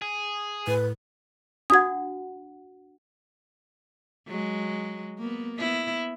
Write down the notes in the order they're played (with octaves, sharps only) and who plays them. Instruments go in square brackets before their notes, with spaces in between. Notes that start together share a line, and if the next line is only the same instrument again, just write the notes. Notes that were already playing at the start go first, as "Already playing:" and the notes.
[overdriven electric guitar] G#4
[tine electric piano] A2 [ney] B4
[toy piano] D4 F#4 F#5 [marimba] D#6 G#6
[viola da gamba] F#3 G#3
A#3 B3
B3 E4